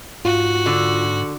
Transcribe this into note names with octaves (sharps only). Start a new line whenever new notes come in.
G#2 F4 F#4
D3